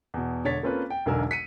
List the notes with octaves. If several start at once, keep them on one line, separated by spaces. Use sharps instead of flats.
E2 B2
E1 D3 C#5 A6 B6
A#3 C4 C#4 F4 A4 B4
G5
E1 B1 D3 A#4 G#5 E6
B6 C#7 D#7